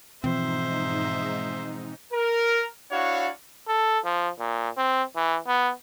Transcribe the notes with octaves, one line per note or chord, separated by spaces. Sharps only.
G#2 B2 E3 F3 C4 D#4 C5 E5
A#4
D4 E4 F#4 C#5 F5 F#5
A4
F3
A#2
C4
E3
B3